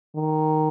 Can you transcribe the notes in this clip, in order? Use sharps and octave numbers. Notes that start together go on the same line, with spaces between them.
D#3